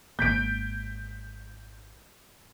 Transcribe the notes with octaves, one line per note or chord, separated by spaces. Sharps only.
G#1 F2 A#3 G6 B6 D7